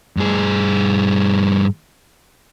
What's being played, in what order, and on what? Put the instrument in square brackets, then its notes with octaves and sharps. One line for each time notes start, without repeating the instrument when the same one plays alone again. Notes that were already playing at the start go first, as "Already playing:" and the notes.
[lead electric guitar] G2 G#4